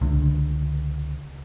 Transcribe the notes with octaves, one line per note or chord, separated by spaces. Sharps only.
C#2 D3